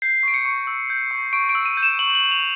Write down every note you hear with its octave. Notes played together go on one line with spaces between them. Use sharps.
G6 C7
C#6 D7
C#7
C#6
E6
G6
C#6
C#6 D7
D7
E6
D#7
G6
E7
C#6 F#7
F#7
C#6
F7